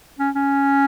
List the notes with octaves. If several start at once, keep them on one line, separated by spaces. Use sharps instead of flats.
C#4
C#4